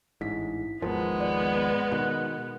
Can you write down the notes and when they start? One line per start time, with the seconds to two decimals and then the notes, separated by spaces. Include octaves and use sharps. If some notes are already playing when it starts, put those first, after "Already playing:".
0.21 A1 G#2 E4 B6
0.82 G#1 D#2 F3 G#3 B3 A#4
1.20 D5
1.92 B2 D#3 F#6